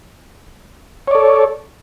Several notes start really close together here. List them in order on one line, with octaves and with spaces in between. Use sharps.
C#5 D5 A4